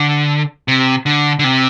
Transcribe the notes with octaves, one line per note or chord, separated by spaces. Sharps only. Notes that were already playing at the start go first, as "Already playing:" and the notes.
Already playing: D3
C3
D3
D3
C3